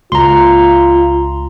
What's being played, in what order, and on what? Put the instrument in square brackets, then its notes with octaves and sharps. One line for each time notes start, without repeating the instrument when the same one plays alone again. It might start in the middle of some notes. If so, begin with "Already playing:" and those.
[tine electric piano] C#2 [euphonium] F4 [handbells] A#5 C6